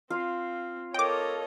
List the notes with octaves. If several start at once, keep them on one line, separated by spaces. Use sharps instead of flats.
C4 F4 F5
A4 A#4 C#5 D#5 G5 D6